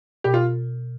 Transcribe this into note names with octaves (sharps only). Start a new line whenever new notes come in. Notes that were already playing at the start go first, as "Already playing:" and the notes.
B2 G4
F4